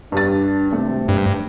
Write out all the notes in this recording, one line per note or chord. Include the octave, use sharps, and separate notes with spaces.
G2 D4 G4 A6
G#1 C3 A3 C4
G2